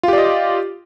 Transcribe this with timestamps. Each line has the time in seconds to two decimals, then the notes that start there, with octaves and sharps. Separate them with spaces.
0.03 F4
0.08 G4
0.13 D5
0.18 D#5